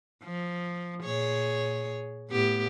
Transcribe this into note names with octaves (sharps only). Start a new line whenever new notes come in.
F3
A#2 G#4 C#5
A2 B3 G4